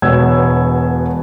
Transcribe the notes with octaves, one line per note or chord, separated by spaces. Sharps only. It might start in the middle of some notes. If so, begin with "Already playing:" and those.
E1 B2 B3 C#5 E6 G#6